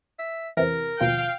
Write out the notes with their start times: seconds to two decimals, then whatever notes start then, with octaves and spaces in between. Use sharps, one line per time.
0.19 E5
0.57 E2 C3 E3 A#4
1.01 D#2 B2 F3 F5 G5